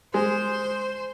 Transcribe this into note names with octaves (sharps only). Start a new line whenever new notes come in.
G#3 C5